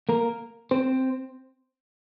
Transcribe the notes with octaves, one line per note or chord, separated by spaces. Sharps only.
A#3 A#4
C4 C5